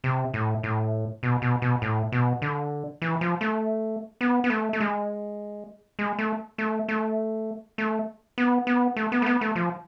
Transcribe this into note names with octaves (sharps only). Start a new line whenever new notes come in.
C3
A2
A2
B2
B2
B2
A2
B2
D3
E3
F3
A3
B3
B3
A3
A3
G#3
G#3
A3
A3
A3
A3
B3
B3
A3
B3
A3
B3
A3
F3